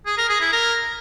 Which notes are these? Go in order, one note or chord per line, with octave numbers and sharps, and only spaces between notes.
G#4
A#4
G#4
E4
A#4